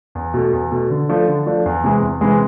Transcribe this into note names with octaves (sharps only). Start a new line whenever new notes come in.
E2
B2 A3
E2
B2 A3
D3
F3 A3 D4
D3
F3 A3 D4
E2
C3 E3 G#3
E2
C3 E3 G#3